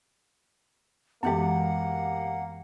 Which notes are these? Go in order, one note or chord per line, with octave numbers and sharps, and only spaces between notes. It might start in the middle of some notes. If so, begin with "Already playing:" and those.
F#2 E3 G#3 A#3 B3 G4 F#5